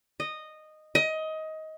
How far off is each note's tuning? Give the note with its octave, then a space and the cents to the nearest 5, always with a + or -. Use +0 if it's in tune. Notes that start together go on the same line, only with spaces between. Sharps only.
D#5 -10
D#5 +20